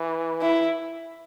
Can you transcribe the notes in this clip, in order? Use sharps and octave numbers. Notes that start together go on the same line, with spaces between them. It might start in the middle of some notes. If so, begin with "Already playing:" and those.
Already playing: E3
E4